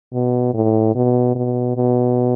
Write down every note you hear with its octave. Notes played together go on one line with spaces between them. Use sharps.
B2
A2
B2
B2
B2